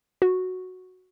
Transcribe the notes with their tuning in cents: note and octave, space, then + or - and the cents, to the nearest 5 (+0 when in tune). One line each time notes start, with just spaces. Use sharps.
F#4 -5